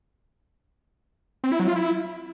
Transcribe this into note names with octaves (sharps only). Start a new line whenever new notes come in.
C4
E4
F#3
F4
E4